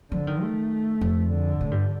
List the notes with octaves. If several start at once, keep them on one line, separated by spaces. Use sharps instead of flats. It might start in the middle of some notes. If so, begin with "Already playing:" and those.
D3 F3
D#3
A3
F2
D3
A2
G2